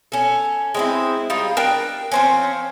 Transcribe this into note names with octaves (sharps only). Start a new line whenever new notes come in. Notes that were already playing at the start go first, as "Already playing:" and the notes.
C#4 A4
G#3 C4 E4
G3 D#4 F4
D4 A#4 G5 A5
F3 C4 C#4